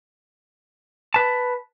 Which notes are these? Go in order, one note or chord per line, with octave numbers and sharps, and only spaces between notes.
B4 A5